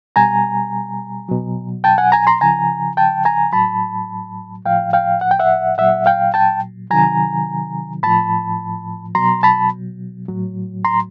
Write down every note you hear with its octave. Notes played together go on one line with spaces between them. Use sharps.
B2 G3 G#5 A#5
B2 F#3
G5 A5
F#5 G#5
G#5 A#5
A#5 C6
C#3 F3 G#5 A#5
G5 A5
G#5 A#5
A2 F#3 A5 B5
A2 F3 F5 G5
F5 G5
F#5
G5
E5 F#5
A#2 F#3 E5 F#5
F5 G5
G5 A5
C3 D#3 F#3 G#5 A#5
A2 F3 A5 B5
B2 F#3 A#5 C6
A5 B5
A2 F#3
A#5 C6